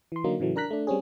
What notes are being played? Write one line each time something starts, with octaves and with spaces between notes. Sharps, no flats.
E3 C6
D3 F#3 A#3 D#4
A2 C#3 E3 F#3 A3
D4 A#4 A#5 F#6 B6
A3 D4
G3 C4 C#4 G#4